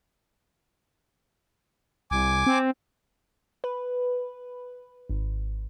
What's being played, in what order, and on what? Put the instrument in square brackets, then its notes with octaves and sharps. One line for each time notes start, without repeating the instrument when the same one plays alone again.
[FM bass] C2 [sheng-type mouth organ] G#5 D6
[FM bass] C4
[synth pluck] B4
G#1